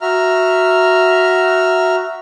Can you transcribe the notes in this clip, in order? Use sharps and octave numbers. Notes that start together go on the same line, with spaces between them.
F#4 E5 A#5 F6